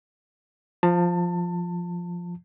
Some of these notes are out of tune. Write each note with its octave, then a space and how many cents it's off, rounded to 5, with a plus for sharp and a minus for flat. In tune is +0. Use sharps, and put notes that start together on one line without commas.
F3 +0 A5 +25